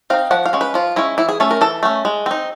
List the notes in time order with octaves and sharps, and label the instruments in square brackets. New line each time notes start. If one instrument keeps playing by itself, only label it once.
[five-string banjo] C4 D#4 F5
F3 F#5
F5
G#3 C#4
B4
F3 F4
G#3 C#4 E4
E3 E4
G#4
A3 C#4 A4
A#4
E3 A4
A3 C#4
G#3
C4 D#4